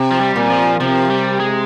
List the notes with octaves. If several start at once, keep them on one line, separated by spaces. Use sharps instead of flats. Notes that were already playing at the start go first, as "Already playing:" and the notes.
Already playing: C3
F3
G3
A#2
F3
C3 F3
G3
G#3